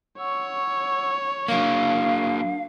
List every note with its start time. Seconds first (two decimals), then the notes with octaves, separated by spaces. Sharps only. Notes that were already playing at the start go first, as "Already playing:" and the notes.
0.18 C#5 F#5 C#6 E6
1.48 F#3 A#3 D4 F5